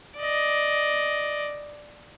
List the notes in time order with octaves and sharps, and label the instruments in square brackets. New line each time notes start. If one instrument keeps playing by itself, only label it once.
[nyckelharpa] D5 D#5